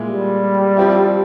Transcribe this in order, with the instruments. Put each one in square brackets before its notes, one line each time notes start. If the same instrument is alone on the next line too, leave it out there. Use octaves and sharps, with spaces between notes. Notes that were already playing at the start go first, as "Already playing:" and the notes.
Already playing: [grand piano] A#2 G#3 E4
[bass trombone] G3
[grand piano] F3 C4 E4